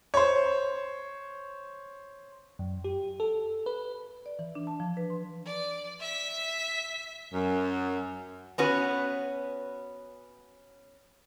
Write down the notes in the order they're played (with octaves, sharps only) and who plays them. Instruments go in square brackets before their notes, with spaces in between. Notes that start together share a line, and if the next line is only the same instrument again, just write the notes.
[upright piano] C5 C#5
[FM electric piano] F#2
G4
A4
B4
[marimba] D5
E3
D4
A5
F3
B4
C6
[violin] D5
E5 B6
[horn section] F#2
[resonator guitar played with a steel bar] B3 C#4 F#4 B4